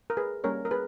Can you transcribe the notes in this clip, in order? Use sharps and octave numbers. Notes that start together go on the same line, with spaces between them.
A#4
G#4 B4
G3 A#3 C#4 A#4 C#5
A#4
G#4 B4